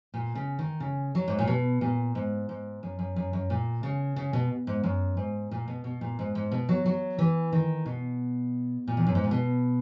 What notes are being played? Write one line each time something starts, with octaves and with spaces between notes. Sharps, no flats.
A#2
C#3
D#3
C#3
F#3
G#2
A#2
B2
A#2
G#2
G#2
F#2
F#2
F#2
F#2
A#2
C#3
C#3
B2
G#2
F#2
G#2
A#2
B2
B2
A#2
G#2
G#2
B2
F#3
F#3
E3
D#3
B2
A#2
E2
F#2
G#2
A#2
B2